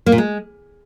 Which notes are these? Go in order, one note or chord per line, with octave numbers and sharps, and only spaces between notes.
A#3
A#2
G#3